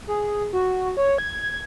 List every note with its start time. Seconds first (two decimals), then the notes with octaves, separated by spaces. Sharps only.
0.07 G#4
0.53 F#4
0.97 C#5
1.18 G#6